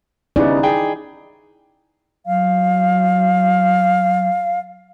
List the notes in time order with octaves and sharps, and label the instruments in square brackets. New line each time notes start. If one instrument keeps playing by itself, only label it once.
[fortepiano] C#3 G3 B3 [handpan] D#4 E4 D5
[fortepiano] G#4 G5
[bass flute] F#3 [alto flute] F5